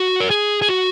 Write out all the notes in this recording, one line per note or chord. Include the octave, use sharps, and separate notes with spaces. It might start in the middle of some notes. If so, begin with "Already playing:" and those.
Already playing: F#4
A#4
G#4
G#4
F#4